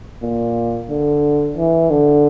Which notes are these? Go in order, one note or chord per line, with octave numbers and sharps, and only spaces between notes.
A#2
D3
E3
D3